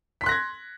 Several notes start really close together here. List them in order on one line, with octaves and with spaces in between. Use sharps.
B6 C6 F#6 A#6 G#6